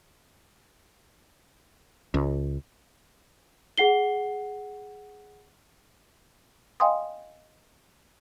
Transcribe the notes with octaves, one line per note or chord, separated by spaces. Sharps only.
C#2
G#4 F#5 C7 G7
D#5 F5 G5 G#5 C6 D#6